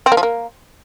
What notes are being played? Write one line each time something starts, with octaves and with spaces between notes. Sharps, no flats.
C4
A#3
F3
A#3